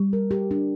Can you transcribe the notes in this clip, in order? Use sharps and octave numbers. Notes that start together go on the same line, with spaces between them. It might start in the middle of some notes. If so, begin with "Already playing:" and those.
Already playing: G3
A#4
G4
D4